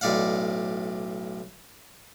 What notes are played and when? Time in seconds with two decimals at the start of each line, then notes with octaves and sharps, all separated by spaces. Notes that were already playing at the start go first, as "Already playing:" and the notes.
0.01 B1 A2 D5 F5 F#5